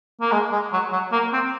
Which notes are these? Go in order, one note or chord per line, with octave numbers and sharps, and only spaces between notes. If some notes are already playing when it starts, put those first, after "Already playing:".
A#3
G#3
G#3
F#3
F#3
A#3
C4